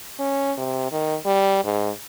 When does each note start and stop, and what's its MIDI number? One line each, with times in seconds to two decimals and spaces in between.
0.19 0.52 61
0.58 0.91 48
0.92 1.15 51
1.25 1.63 55
1.64 1.90 44